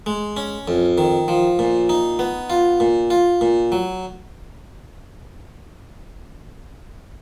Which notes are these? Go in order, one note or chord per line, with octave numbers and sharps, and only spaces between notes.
G#3
C#4
F2
D#3
F3
A#2
D#4
B3
F4
A#2
F4
A#2
F#3